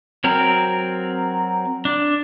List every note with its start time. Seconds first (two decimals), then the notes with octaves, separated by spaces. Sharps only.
0.24 F#3 C4 A#4
1.85 D4